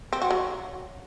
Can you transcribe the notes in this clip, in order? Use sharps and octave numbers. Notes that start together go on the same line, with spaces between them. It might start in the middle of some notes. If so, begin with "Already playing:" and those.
C4
F#4
F#3